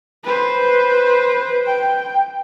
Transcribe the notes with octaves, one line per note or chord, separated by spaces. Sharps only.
B4 C5
G5